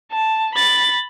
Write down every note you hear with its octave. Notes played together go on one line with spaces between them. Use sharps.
A5
B5 A6